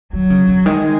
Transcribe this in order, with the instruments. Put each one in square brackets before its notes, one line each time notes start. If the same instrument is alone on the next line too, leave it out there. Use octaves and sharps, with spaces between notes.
[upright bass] D#3 [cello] F#3
[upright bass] C#3
C#3
[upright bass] D#3 [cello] G#3